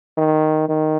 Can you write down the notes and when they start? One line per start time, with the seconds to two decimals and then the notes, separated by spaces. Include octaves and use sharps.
0.18 D#3
0.69 D#3